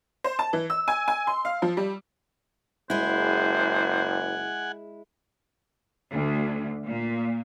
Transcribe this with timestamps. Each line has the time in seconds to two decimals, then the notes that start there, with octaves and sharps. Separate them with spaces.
0.24 C5
0.39 A5
0.53 E3
0.70 E6
0.88 G#5
1.08 G#5
1.27 C6
1.45 F5
1.62 F3
1.77 G3
2.90 F#1 G#3 E4 C5 F#5 G#5
6.13 D2
6.86 A#2